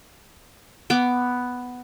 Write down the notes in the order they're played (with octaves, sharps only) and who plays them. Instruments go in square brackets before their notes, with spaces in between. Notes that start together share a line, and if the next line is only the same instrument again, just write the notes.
[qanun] B3 D6